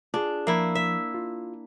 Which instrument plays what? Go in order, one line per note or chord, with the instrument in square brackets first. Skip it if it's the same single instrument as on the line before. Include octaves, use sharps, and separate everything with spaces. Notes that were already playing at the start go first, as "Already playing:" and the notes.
[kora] D4 [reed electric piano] F4 G#4
[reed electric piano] F3 [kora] A#3 E4
[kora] E5
[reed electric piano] F4